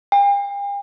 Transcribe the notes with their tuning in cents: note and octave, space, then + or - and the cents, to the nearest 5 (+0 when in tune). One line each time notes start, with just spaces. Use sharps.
G5 +45